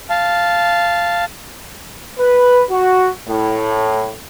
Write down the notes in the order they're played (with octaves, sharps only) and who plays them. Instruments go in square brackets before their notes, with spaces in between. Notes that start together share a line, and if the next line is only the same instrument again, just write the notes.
[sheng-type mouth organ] F5 A5
[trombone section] B4
F#4
A2